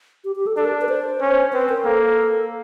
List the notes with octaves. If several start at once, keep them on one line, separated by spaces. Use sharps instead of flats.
G4
G4
A4
D4 A4
A#4
B4
C5
C#4
C4 B4
A#4
A#3 A4